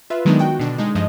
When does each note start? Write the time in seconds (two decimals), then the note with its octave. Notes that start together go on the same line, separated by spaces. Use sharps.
0.10 F4 B4 E5
0.25 D#3 F#3 G#3 B3 D4 D#4
0.39 F#4 G5
0.59 B2 D3 D4
0.78 G#3 D#4
0.95 G2 F3 D#5